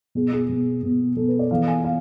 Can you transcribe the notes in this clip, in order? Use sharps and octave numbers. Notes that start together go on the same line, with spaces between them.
B2 B3 G#4
G#4
B2 B3
B2 B3
B2 B3 A4
B4
D5
E3 B3 F5
G#5
B3 F5